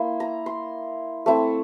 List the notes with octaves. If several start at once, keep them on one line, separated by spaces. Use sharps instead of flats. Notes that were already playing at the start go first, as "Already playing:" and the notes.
Already playing: A#3 E4 C6
A#5
C6
A3 C4 E4